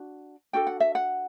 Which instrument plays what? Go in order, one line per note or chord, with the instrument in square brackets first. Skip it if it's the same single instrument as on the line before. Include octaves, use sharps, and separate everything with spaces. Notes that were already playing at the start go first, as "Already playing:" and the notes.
Already playing: [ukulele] D4 F#4
D4 F#4 A4 G5
F#5
E5
F#5